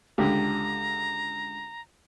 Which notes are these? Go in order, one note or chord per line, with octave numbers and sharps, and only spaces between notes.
C#2 D3 G4 A#5